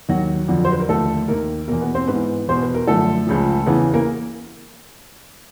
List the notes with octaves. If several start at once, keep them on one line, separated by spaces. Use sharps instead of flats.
D#2 D#3 F#3 F#4
F2 D3 F3
C5
B4
A#4
D#2 D3 F3 A3 A4
D#2 D#3 A#3 A#4
E2 B2 A#3 A#4
B3 B4
C4 C5
G#2 E3 B3 B4
E2 B2 C5
B4
A#4
F#2 D3 F3 A3 A4
C#2 C#3 F3
E2 C#3 E3 B3 B4
A#3 A#4